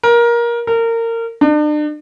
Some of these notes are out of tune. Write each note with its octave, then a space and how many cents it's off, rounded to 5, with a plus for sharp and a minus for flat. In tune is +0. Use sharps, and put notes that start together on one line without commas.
A#4 +20
A#4 -25
D4 +40